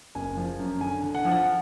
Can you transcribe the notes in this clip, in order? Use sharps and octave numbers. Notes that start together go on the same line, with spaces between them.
F#1 G#5
F3
F#2
D3 G#5
D3
F#5
F3
F#5